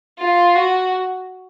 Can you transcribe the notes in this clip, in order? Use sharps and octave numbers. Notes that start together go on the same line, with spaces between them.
F4
F#4